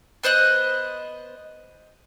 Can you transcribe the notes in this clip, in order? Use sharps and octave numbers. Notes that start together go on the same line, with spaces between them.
B3 C5 D#5 F#6